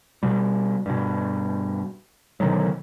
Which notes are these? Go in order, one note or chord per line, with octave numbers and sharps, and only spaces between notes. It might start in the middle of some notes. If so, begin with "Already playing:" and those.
B2 G3
G2 B2
B2 D3 D#3 F#3